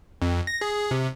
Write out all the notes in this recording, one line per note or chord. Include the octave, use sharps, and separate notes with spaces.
F2
A#6
G#4
C3